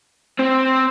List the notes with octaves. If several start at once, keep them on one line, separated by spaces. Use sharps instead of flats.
C4